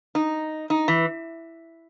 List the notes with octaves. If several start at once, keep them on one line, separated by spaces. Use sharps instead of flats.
D#4
D#4
E3